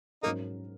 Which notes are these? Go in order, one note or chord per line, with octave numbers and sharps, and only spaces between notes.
G#2 F#3 A#3 C#4 D#4 A#4